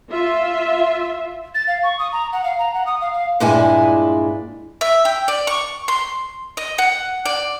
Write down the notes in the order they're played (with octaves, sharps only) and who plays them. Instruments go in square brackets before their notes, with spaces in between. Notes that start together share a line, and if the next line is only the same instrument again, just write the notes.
[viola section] F4 E5
[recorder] A6
F5
C#6
D#6
A#5
F#5
F5
A#5
F#5
D#6
F5
F5
[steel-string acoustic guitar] G2 A#2 G#3 D4 E4 G#5
[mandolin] E5
G5
D5
C#6
C6
D#5
F#5
D5